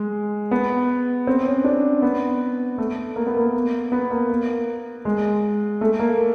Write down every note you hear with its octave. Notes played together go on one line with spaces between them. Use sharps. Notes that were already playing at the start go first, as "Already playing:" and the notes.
Already playing: G#3
B3
C4
C#4
D4
B3
A3
A#3
B3
A#3
B3
A#3
A#3
G#3
A3
A#3